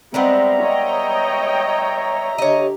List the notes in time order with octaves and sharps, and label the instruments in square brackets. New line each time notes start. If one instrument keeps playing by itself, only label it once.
[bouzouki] G3 G#3 B3 [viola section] C4 [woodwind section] E5 A#5
[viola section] C#5 D#5 G5
[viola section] D3 G4 [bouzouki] C#5 D#5